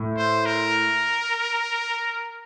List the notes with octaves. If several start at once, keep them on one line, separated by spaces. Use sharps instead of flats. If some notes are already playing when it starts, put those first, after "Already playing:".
Already playing: A2
C5
A#4